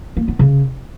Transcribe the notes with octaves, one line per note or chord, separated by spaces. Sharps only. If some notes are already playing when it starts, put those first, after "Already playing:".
A#3
B3
C#3